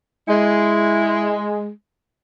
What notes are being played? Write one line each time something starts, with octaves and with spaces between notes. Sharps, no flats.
G#3 E4